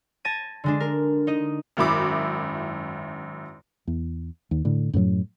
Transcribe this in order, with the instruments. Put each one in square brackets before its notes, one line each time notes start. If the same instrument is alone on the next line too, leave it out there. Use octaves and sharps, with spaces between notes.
[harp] A5 G#6 A#6 D#7
D3 G#3 D4
A#4
D#4 D#5
[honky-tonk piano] G#1 F#2 E4 B5 D6
[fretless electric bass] E2
D#2
A2 D3
F#2 A2 F3 F#3